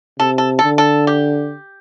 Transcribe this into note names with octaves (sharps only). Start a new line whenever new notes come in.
C3 A4
A4
D3 A4
A4
G4